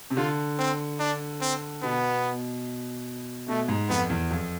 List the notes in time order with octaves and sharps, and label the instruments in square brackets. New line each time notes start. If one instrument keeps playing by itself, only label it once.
[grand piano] C3
[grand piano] D3 [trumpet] F4
[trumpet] C4
D4
C4
[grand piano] B2 [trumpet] B3
[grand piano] B2 [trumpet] A3
[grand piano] G#2
[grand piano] F2 [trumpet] B3
[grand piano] E2
F2